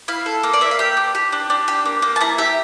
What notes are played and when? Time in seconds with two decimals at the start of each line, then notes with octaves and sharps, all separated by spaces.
0.08 E4 F5
0.26 A4
0.43 A#3
0.53 D5
0.61 A#3 E5
0.71 F5
0.79 G4 G5
0.97 D4
1.15 G4
1.32 D4
1.50 D4
1.68 G4
1.85 A#3
2.02 A#3
2.16 A5
2.21 E4 A#5
2.38 G4 E5